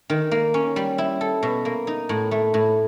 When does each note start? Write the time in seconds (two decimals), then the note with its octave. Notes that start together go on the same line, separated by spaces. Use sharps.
0.10 D#3
0.31 A#3
0.54 C#4
0.76 G3
0.98 E4
1.21 A4
1.43 B2
1.65 A#3
1.87 D#4
2.09 A2
2.31 A3
2.54 A2